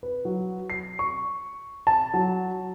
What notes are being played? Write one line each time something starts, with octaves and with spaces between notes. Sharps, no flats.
B4
F#3
C7
C#6
A5
F#3